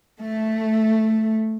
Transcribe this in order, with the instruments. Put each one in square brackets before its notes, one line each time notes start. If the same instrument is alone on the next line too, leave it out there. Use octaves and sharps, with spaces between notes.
[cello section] A3